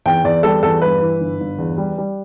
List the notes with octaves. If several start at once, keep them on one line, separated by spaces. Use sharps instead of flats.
E2 G5
E2 D5
G3 A4
E2 A4
G2 B4
E3
G1
G1
E2
G3
G3